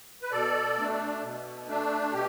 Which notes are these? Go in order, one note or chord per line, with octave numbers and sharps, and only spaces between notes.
B4
B2 A4 D5
A3 D4
B2
A3 D4
B2 G4